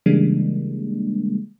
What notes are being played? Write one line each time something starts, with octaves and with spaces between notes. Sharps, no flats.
C#3 E3 G3 G#3 A#3 D4